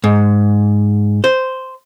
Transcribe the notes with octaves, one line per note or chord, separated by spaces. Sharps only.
G#2
C5